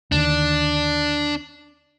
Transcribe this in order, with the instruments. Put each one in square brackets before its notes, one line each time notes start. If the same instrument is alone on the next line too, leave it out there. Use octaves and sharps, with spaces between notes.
[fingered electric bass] D#2 D3 D#3 [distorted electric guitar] D4